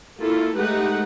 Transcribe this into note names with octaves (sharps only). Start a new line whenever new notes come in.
A#3 E4 F4 A4
G#3 A3 D#4 G4 B4 F#5